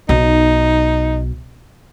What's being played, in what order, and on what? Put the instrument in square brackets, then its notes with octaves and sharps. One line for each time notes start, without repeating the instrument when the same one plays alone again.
[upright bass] B1 [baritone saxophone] D#4